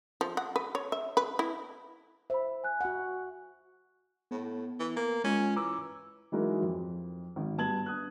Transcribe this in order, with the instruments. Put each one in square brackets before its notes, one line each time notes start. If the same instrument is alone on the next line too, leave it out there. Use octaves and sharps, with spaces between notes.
[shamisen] F3
F#5
B4
C#5
E5
B4
E4
[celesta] C5 B5 [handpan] E5
[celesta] G#5 F#6
[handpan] F#4 F#5
[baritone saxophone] A2 [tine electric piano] B3
[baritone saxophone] E3
A#3
[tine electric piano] G#3 F4 [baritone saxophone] C#4
[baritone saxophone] E3 [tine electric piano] A#5 D6 E6
[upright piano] E3 F#3 G#3 D#4 F#4 A#4
F2
G#1
G2 B3 A5 G#6 F#7
D4 D#6 F#6